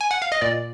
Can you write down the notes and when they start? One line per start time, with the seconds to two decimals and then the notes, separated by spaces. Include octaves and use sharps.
0.01 G#5
0.11 F#5
0.22 F5
0.32 D#5
0.41 A#2 D5